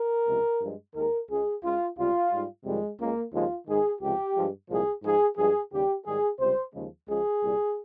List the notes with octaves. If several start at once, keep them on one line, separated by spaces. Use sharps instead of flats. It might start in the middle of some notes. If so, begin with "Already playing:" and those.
Already playing: A#4
C#2 C3 F3 G#3
G2 F3 G#3
D#2 D#3 G#3 A#4
C#2 C#3 G#3 G#4
C#2 C#3 G#3 F4
C#2 C3 G3 F4
G#2 G3
F2 C3 D#3 G3 G#3
C#2 C#3 G#3 A#3
D#2 C#3 F3 G#3 F4
G#2 D#3 G#3 G#4
C#2 C3 F3 G#3 G4
G2 F3 G#3
C2 A#2 F3 G#3 G#4
G#2 F3 G#3 G#4
G2 F3 G#3 G#4
D#2 C#3 G3 G4
G#2 D#3 G3 G#4
C#2 C3 G3 C5
D#2 C#3 F3 G#3
C#2 C#3 F3 G#3 G#4
C2 A#2 G3